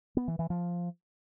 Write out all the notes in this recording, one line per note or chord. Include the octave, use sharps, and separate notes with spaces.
B3
E3
E3
F3